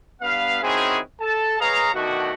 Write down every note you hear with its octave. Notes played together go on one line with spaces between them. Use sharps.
G2 B3 B4 F5
D#3 C4 C#4 E4 F#4 G#4
A4 A5
G#4 B4 C#5 D#5 F5 A#5
B2 D#3 A3 D4 F#4